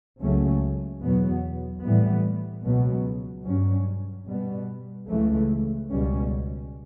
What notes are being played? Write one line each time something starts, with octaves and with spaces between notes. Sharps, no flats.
C#2 C#3 F#3 A3 C#4
E2 B2 F#3 B3
A2 E3 G3 B3
C#2 B2 F#3 B3
G2 F#3 C#4
B2 G3 B3
C#2 C#3 E3 A3
C#2 B2 G3 C#4